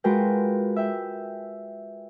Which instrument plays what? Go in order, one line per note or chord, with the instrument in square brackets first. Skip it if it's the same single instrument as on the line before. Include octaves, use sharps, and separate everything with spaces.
[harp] G#3 F4 F#4 A#4 B4 G5
E5 G5